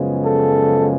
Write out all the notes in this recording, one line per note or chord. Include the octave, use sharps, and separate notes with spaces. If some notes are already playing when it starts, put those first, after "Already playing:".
Already playing: F#2 C#3 F3 G#3 B3
A4